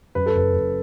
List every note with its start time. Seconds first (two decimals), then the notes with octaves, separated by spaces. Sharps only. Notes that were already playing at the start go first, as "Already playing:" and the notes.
0.15 F#2 B4
0.26 A4
0.34 F#1 B4
0.53 F#1